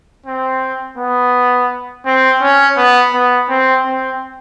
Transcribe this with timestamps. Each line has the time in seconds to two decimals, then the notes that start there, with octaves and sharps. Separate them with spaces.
0.26 C4
0.97 B3
2.06 C4
2.41 C#4
2.77 B3
3.14 B3
3.49 C4
3.86 C4